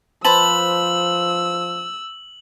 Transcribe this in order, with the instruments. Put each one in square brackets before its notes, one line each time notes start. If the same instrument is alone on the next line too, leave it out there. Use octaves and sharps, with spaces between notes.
[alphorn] F3 [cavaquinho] B4 C5 A5 [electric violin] E6 [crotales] F#7